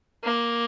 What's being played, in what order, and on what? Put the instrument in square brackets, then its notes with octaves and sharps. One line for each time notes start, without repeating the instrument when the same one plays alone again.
[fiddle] A#3